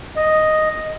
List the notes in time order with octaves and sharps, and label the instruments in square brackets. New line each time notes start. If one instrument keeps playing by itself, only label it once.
[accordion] D#5